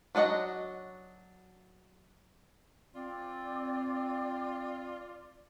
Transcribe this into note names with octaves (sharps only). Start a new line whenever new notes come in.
F#3 D4 F#4 D#5 F#5
C4 F4 D5